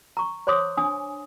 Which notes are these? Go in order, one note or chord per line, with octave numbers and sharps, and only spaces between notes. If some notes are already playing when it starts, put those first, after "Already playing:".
A#5 C#6
C5 C#5 C6 D6 D#6
D4 G#5 D#6